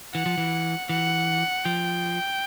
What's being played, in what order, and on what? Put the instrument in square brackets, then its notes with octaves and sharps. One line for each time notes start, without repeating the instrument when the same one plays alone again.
[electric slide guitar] E3 [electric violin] F#5
[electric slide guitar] F3
E3
[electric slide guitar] E3 [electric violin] F#5
[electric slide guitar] F3 [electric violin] G5